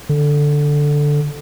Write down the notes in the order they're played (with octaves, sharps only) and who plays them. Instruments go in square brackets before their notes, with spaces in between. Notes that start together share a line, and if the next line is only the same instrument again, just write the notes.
[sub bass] D3